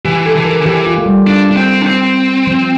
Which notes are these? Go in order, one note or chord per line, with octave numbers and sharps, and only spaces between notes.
E3 G4
A4
E3
A#4
D3
E3 G4
F4
A3
G3
D4
D4
C4
D4
C4
F3